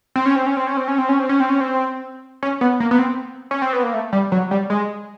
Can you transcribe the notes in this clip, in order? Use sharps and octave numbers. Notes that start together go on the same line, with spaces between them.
C4
C#4
C4
C#4
C4
C#4
C4
C#4
C4
C#4
C4
C#4
C4
C#4
C4
C#4
B3
A#3
B3
C4
C#4
C4
B3
A#3
A3
G3
F#3
G3
G#3